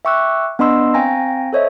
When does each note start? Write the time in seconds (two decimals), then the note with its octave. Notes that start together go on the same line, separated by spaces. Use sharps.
0.05 E5 G5 C#6 D6 E6 F#6
0.59 B3 D4 D#5 B5 C6 E6
0.94 C4 F5 G5 G#5 A#5 A#6
1.53 A4 C5 C#5 D#5 E5